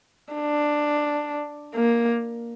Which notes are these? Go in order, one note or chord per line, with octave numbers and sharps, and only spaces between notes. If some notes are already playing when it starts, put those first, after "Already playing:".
D4
A#3